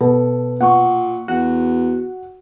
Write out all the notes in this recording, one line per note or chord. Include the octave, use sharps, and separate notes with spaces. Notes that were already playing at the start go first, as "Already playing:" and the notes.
B2 A4
A#2 F#5 C#6
E2 F#4